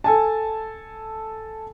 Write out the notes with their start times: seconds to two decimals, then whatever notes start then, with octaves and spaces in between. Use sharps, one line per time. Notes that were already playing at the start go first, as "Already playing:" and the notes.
0.04 A4 G#5 A5